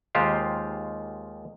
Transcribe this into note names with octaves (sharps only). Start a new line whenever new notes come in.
D#2 D#3 G#3 F4 G4 C5